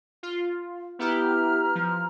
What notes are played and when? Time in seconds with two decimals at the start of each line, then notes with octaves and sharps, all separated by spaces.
0.23 F4
0.99 B3 E4 G4 B4 A#5 F6
1.75 F3